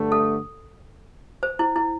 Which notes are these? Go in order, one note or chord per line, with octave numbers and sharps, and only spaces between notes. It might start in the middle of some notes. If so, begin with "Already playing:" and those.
Already playing: G2 D3 A3
A4
C5
E4
E4